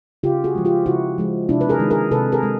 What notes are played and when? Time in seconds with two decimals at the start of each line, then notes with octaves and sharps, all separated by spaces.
0.23 C#3 F4 G4
0.44 F#4 G#4
0.55 F3 G#3
0.65 F4 G4
0.86 C#3 E4 F#4
1.18 F3 G#3
1.49 C3 D4 E4
1.61 B4
1.69 G#4 A#4
1.80 D#3 G#3
1.90 G#4 A#4
2.11 C3 A4 B4
2.32 G#4 A#4
2.43 G#3